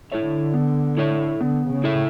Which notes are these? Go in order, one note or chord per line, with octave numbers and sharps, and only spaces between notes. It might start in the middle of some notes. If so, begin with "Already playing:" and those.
D3 E4 A4 C#5 E5
B3
E4 A4 C#5 E5
D3 B3
C#3
E4 A4 C#5 E5